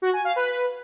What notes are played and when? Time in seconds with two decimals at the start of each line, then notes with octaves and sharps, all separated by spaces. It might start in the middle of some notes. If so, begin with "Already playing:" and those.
0.02 F#4
0.13 G#5
0.25 F5
0.36 B4